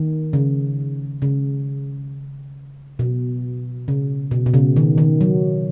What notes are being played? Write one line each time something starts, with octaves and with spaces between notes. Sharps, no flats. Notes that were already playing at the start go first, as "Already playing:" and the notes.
Already playing: D#3
C#3
C#3
B2
C#3
B2
B2
C#3
D#3
D#3
F#3